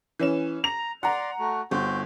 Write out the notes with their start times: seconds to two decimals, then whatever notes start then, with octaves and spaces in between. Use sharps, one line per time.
0.19 E3 C#4 E7
0.64 A#5 F7
1.03 D5 F#5 A#5 C6
1.39 A3 F#4
1.71 G1 C4 F#4 G6